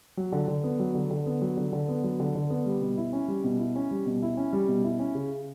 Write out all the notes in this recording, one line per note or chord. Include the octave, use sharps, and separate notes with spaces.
F#3
D3
D3
B3
F#3
D3
D3
B3
F#3
D3
D3
B3
F#3
D3
D3
B3
G3
B2
E4
C#4
G3
B2
E4
C#4
G3
B2
E4
C#4
G3
B2
E4
C#4
C#3